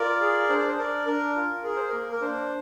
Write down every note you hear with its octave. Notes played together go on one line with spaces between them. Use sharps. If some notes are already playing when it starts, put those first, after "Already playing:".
Already playing: F4 A#4 D5
G#4
D4 C5
D5
C5
D4 A#4 D5
D4 A#4
F4
G#4 A#4
C5
A#3 A#4
A#4
D4 C5